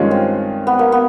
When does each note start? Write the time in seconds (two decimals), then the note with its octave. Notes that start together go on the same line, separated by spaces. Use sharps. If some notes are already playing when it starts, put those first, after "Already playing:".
Already playing: G2 D#3 G#3 C#4 F4
0.11 C4
0.67 B3
0.79 A#3
0.92 B3